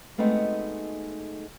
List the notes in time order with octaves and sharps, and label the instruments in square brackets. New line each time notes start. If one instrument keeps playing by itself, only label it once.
[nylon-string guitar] G#3 A3 B3 C4 D#4 F#4